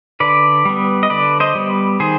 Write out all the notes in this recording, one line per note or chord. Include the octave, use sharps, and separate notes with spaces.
D3 B4 D5
G3 B3
D#5
D3 B4 D5
C5 D#5
G3 B3
D#3 G#4 C5